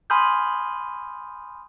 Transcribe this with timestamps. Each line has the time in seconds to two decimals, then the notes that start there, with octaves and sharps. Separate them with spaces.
0.10 G#5 B5 C6 D#6 F6 G6